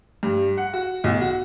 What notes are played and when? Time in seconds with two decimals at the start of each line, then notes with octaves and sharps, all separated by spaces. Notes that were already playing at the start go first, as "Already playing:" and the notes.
0.23 G2
0.57 F#5
0.74 F#4
1.04 B1
1.21 F#4